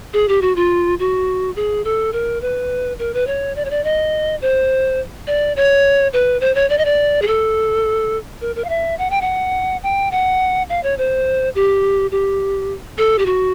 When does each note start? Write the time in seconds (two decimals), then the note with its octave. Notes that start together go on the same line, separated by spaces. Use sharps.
0.13 G#4
0.28 G4
0.42 F#4
0.56 F4
0.99 F#4
1.56 G#4
1.85 A4
2.13 A#4
2.42 B4
2.99 A#4
3.14 B4
3.27 C#5
3.56 D5
3.65 C#5
3.70 D5
3.84 D#5
4.42 C5
5.27 D5
5.56 C#5
6.13 B4
6.41 C5
6.55 C#5
6.70 D5
6.78 D#5
6.85 D5
7.22 G#4
7.27 A4
8.41 A#4
8.56 A#4
8.64 F5
8.69 E5
8.98 F#5
9.10 G5
9.21 F#5
9.83 G5
10.11 F#5
10.69 F5
10.83 C#5
10.98 C5
11.55 G4
12.11 G4
12.98 A4
13.18 G4
13.26 F#4